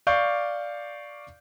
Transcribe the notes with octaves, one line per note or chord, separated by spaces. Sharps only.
D5 F5 C#6 D6 G6